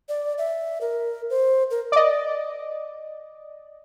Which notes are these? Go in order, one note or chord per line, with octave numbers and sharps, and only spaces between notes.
D5
E5
A#4
C5
A#4
D5 D#5